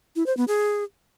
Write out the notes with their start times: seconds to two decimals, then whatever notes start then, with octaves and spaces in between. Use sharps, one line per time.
0.16 E4
0.26 C5
0.37 B3
0.48 G#4